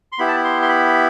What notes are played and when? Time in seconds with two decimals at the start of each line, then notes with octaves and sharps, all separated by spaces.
0.12 C6
0.19 B3 E4 G4 B5
0.28 A5
0.36 B5
0.44 C6
0.62 C6
0.69 B5